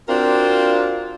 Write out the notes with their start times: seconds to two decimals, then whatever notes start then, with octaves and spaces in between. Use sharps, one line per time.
0.08 C4 D4 F4 F#4 A#4